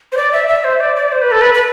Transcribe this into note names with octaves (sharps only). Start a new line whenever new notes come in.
C5
D5
E5
E5
C5
D5
D5
C5
B4
A4
B4
B4